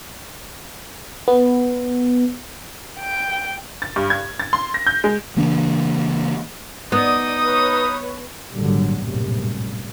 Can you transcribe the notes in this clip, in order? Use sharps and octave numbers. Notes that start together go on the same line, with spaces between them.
B3
G5
A6
G2
G#6
A6
C6
A#6
G6
G#3
C#3 E3 A#3 D4
B3 D#4 D5 D#6
B4 C#5
G#1 A#2 D3 F#3 G3
A#1 F#2 A2 C3 G3